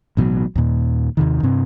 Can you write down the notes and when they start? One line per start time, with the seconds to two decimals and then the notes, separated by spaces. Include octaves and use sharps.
0.17 A1 B2 D3 F#3
0.56 D#2 A#2
1.17 D#2 C3 D#3
1.43 G2 C3 C4